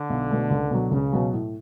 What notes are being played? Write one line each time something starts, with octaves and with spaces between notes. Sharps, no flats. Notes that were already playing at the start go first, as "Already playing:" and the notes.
Already playing: D3
B1
B2 A3
C#2
B2 F#3
C#2 C#3
B2 F#3
A2